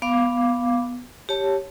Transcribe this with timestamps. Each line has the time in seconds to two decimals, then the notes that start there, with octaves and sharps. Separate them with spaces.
0.02 B3 F5 D6
1.29 G4 C#5 A5